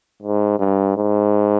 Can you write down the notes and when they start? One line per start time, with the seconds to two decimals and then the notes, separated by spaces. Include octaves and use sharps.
0.23 G#2
0.59 G2
0.97 G#2